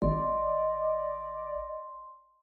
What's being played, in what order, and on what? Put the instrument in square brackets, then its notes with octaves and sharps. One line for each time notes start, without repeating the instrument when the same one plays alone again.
[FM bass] G#1 [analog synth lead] D5 [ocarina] D#5 [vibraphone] C6